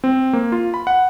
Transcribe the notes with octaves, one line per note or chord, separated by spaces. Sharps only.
C4
A#3
F4
B5
F#5